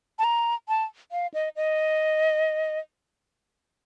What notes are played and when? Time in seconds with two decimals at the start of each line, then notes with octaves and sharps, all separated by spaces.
0.19 A5
0.24 A#5
0.69 A5
1.12 F5
1.34 D#5
1.56 D#5